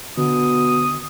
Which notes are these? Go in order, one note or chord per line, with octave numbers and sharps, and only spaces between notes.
B2 D3 D#6